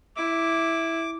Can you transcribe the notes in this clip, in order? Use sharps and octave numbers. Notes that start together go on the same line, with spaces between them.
E4 D6